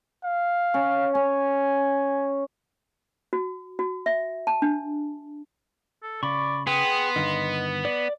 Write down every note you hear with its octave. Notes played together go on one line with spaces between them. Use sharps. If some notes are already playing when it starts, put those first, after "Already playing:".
F5
C#4
C#4 G#5
F#4
F#4
E5
A5
D4
A4
C#3 D5 B5 C#6
B3 G#4 G5 C6 D#6
G2 D3 D#3 D#5
D5